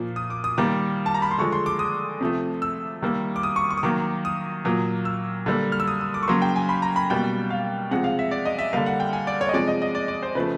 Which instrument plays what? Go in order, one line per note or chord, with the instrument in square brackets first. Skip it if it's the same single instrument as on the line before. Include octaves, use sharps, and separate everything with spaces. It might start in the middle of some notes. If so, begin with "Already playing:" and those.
Already playing: [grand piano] A#2 F3 A#3
D#6
D6
D#6
D#3 G3 A#3 D6
A5
A#5
B5
C6
D3 F3 G#3 C#6
C6
D6
D#6
C3 F3 A3
E6
D#3 G3 A#3
D6
D#6
C#6
C#6
D#6
D#3 F#3 A#3 D6
D#6
A#2 F#3 A#3
E6
D3 G3 A#3
F6
E6
D#6
D#6
D6
C#6
C#3 F#3 A#3 C6
G5
G#5
B5
A#5
B5
B2 G3 A#3 G5
F5
C3 F3 G#3 F#5
F5
E5
D5
D#5
E5
D3 G3 A#3 F5
F#5
G5
G#5
D5
C#5
D#5
C3 F3 G#3 D5
D#5
D#5
D5
D5
C5
C#3 F3 A3 B4